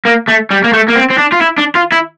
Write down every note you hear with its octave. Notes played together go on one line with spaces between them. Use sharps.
A#3
A3
G3
A#3
A3
A#3
C4
C4
D4
F4
E4
D4
F4
E4